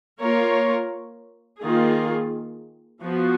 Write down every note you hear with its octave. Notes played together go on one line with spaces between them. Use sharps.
A#3 F4 A#4 C#5
D#3 A#3 F4 G#4
F3 B3 F#4